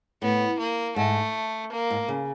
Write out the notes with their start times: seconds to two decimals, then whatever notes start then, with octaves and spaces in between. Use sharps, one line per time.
0.22 A2 B3
0.59 A#3
0.96 G#2 A3
1.71 A#3
1.90 G#2
2.08 C#3